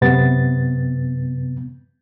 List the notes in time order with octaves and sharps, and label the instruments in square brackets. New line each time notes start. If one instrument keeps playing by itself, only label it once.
[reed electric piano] F#2 C3 B3 A6